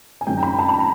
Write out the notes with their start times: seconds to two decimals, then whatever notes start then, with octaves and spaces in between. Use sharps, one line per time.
0.21 G#5
0.27 F#2 D#3 G#3 C#4 G5
0.37 A#5
0.43 B5
0.59 A5
0.69 B5
0.79 A#5